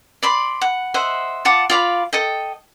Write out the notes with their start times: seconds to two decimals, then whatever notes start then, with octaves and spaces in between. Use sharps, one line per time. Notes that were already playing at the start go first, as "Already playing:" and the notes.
0.23 D5 B5 C6
0.61 F#5
0.94 C5 D#5 E5 F#5
1.45 F4 F#5 A5 D6
1.70 F4 D5 F5 B5
2.13 A4 D#5 G5